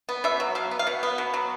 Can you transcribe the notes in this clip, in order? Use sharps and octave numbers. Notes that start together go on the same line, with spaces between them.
B3
B2 E5
F#3
F#3 F5
B3
F5
B2 F#5
B3
B2
F#3